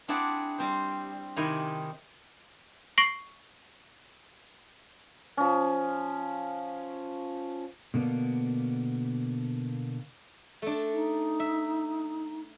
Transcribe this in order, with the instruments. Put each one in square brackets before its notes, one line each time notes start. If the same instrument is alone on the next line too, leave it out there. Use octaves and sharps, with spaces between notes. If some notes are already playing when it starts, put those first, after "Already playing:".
[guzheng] C4 D4 E4 G#4 D5 F#5
G3 C4 C5
C3 D#3 E4 G4 G#5 A#5
[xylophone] C#6 A#6 C7 D7 F#7
[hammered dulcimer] F3 C#4
[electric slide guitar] B2 D3 A#3 B3 D4
[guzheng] A3 D4
[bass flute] D#4
[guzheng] E5